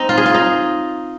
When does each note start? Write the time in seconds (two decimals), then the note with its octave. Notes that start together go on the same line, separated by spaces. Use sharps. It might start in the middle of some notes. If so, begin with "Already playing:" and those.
Already playing: C4 D#4
0.09 F4
0.17 G#4
0.26 F4
0.34 D#4